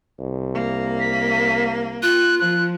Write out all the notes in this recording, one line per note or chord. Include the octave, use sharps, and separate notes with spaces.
C2
A#3
B6
F4 F#6
F3 F#6